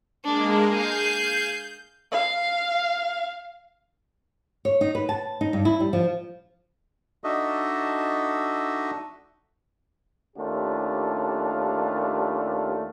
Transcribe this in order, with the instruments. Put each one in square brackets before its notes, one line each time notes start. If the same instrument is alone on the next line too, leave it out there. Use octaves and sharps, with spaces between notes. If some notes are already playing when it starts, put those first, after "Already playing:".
[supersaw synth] G#3 A#3 [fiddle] D4
[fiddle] G#4 F5 [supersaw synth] G6
[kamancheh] F5
[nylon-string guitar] C#5
D#4
B4
A5
D#4
G2
E4
G3
F3
[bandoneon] D4 D#4 F#4 A4 D#5 E5
[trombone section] D#2 A3 C#4 D4 F4 G4